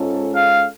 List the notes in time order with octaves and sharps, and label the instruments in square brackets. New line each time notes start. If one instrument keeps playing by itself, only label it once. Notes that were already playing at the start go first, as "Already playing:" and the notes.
Already playing: [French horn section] G#2 G#3 C#4 F4 A4
[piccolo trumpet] F5